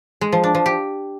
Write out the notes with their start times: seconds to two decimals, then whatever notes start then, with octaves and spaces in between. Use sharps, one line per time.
0.21 G#3
0.32 F3
0.44 D4
0.55 F3
0.66 G4